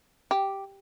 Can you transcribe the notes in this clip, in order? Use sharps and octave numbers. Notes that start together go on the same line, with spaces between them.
G4